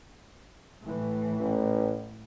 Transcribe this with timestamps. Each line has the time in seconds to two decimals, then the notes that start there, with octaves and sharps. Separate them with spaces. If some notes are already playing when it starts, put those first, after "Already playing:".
0.81 A2 E3
1.40 A1